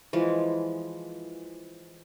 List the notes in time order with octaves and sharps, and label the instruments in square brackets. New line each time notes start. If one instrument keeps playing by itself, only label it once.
[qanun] E3 F3 G#3